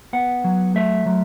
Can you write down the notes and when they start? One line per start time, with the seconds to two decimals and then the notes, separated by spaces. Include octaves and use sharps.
0.13 B3 F#5
0.44 F#3
0.75 A3 E5
1.06 F#3